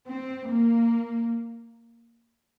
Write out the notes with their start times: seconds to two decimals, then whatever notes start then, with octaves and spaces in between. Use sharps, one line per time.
0.09 C4
0.48 A#3